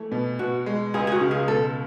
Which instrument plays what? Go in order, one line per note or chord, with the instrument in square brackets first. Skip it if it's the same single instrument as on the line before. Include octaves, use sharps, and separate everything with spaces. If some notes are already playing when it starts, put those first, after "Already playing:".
Already playing: [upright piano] E3 A3
B2
[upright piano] B2 [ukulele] F#4
[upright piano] G#3
[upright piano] C#2 [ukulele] G#4
[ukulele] G#4
F#4
[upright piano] C#3
[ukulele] G#4
[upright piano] B2 [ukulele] A4